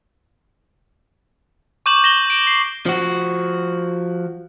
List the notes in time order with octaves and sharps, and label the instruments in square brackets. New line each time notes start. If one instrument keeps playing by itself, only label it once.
[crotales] C#6 D6 G6 E7 F#7
A#6 E7 F#7 G7
D7
C7
[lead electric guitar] F3 F#4